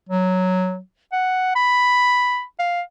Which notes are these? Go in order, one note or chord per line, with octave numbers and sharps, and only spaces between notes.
F#3
F#5
B5
F5